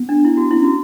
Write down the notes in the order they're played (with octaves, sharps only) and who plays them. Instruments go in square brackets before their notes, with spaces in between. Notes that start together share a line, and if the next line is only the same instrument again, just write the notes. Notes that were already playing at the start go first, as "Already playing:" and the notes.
Already playing: [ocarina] B3
[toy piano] D4
E4
F#4
[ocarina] C#4 [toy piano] E4
[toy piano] F#4